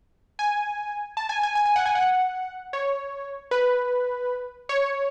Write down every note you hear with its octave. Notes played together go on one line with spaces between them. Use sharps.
G#5
A5
G#5
G#5
G#5
G#5
F#5
G#5
F#5
C#5
B4
C#5